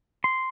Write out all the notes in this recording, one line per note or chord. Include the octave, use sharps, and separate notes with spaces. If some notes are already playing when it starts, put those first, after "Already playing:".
C6